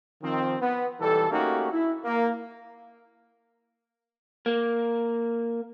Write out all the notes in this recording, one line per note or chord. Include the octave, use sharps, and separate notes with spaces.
D#3 F3 C4
B3
B1 E3 G3 A4
A3 A#3 C#4 D#4 F#4 G4
E4
A#3
A#3